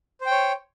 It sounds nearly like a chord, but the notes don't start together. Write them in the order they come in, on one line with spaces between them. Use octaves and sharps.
C5 G5 C#5